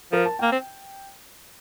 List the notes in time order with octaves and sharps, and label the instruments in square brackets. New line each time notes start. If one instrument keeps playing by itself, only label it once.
[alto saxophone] F3 [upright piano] A#4
[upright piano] A5
[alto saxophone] A#3 [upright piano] G5
[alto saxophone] C4